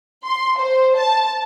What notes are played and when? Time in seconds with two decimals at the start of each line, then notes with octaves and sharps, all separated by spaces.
0.24 C6
0.57 C5
0.95 A5